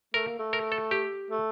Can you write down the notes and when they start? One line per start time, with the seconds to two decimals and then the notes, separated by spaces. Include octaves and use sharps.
0.14 A3 A#4
0.26 A#3
0.39 A3
0.53 A#4
0.72 A4
0.91 G4
1.30 A3